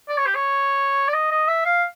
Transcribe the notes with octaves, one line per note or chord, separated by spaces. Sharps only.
D5
C#5
G4
C#5
D5
D#5
D#5
E5
F5